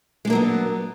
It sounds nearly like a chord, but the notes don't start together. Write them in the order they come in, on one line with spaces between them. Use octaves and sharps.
G#3 D4 A#3 F#3 B3